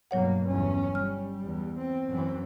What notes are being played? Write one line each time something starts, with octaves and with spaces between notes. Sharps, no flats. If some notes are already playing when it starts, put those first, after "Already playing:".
G2 B2 F#3 A#3 C#5 F#5
G1 E2 C#4
G3 F6
E2
C4
F#2 E3